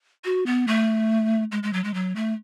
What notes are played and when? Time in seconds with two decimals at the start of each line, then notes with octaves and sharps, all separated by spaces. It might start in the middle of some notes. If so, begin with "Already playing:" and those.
0.25 F#4
0.46 B3
0.67 A3
1.52 G#3
1.63 G#3
1.73 F#3
1.84 G#3
1.94 F#3
2.16 A3